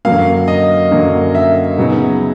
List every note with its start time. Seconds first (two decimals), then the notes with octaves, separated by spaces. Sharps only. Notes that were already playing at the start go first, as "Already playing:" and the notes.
0.05 F#2 D3 F#3 A#3 F5
0.48 D#5
0.91 F#2 D3 F#3 A#3
1.35 E5
1.78 C#3 F#3 B3 D#4